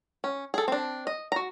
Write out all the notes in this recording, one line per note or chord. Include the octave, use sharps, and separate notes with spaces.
C#4
G#4 A4
C4 D4
D#5
F#4 A#5